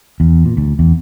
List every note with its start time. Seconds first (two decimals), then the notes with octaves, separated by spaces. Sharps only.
0.20 E2
0.45 A#2
0.57 D2
0.79 E2